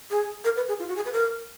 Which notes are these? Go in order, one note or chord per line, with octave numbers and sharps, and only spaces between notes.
G#4
A#4
B4
G#4
F4
F#4
G#4
B4
A#4